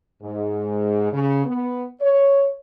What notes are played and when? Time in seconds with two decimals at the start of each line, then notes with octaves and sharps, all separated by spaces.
0.22 G#2
1.12 C#3
1.45 B3
2.01 C#5